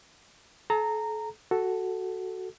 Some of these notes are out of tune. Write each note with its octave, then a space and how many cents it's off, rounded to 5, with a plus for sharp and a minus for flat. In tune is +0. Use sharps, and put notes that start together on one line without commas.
A4 -40 A#5 -15
F#4 +10 A4 +0